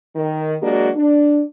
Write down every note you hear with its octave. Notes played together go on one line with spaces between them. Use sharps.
D#3
F#3 G#3 A#3 D4 F#4
D4